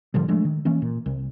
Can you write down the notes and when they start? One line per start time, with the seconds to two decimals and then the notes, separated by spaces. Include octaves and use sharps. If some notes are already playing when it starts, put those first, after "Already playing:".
0.14 A2 D3 F3 G3
0.28 F3 G#3 A3 D4
0.45 D#3
0.65 E3 A#3 C#4
0.82 A#2
1.06 C2